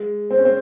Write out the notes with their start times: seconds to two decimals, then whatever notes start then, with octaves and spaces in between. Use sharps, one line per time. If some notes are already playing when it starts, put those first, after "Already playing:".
Already playing: G#3
0.31 C4 C5
0.38 C#4
0.45 C4